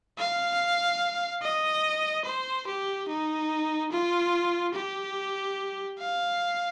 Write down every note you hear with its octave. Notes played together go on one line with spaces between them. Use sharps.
F5
D#5
C5
G4
D#4
F4
G4
F5